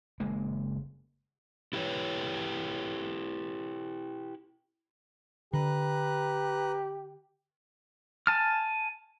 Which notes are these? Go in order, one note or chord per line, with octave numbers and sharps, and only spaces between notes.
F#1 G#3 A#3
E4 F#4 G4 A4 B4 C#5
D3 G4 B4 A#5 F#6
G#5 A5 F6